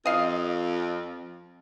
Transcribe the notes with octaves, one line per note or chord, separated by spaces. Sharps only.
F2 D#5 F5